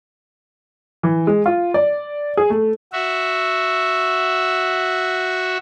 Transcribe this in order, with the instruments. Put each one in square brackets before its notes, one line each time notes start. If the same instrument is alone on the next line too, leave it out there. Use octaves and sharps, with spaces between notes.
[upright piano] E3
G#3
F4
D5
G#4
A3
[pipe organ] F#4 E5